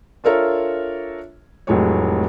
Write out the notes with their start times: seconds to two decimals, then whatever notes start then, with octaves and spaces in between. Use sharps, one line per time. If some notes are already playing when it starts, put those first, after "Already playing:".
0.24 D4 F4 A4 A#4 C#5 E5
1.67 F1 A2 F#3 G#3 G4 C#5